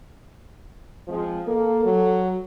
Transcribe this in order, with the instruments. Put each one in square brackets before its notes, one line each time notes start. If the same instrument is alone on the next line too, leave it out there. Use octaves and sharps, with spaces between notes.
[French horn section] F3 G#3 C4
[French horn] A#3 [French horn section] A4
[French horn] F#3